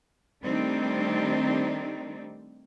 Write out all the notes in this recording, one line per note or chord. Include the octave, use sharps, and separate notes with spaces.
D#3 G3 A3 C4 D4 D#4